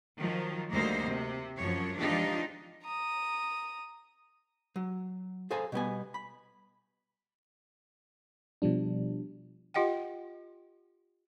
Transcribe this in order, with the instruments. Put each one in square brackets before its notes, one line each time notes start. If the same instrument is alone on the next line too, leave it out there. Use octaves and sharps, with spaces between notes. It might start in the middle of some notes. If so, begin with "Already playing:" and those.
[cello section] D#3 F3 F#3
D2 G3 A#3 D#4 C5
C3
F#2 F3 C#5
F3 G#3 D4 D#4 F4 G4
[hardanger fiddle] A#5 D#6
[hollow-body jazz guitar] F#3
G#4 A4 C5 F5 G#5 A#5
B2 G3 B3 G#5
B5
[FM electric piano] B2 F3 G3 D4
[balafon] F4 G4 D#5 F#5 G5